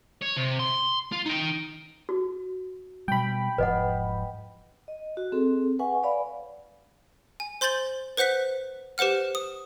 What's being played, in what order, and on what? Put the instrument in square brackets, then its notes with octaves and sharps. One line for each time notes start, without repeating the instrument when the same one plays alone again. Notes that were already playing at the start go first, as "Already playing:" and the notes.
[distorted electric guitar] C#5
C3
C6
F4
D#4 G5
[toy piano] F#4
[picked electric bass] B2 G3 [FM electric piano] G5 B5
[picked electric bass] E1 G#2 F3 [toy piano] B4 D#5 F#5
[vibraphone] D#5
F#4
C4 G#4 A4
B4 E5 F#5 G#5 C#6
B4 C#5 D5 F5 B5
[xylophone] G#5
C5 C6 G6 A6 F#7 G7
B4 C5 F#5 F#6 B6
G4 B4 C5 F#5 F6
D#6